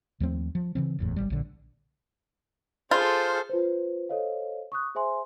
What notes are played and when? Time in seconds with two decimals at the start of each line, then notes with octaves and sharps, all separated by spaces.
0.20 D#2 F3 A3 C4
0.55 F3
0.75 C#3 E3 C4
0.99 F#1 E2 A2
1.16 G#1 D#2 G3
1.30 A#1 D3
2.91 F4 G#4 A4 C5
3.49 F4 B4 C5
4.09 A4 C5 C#5 D#5 F5
4.72 C#6 D#6 F#6
4.95 G#4 C5 E5 G#5 C6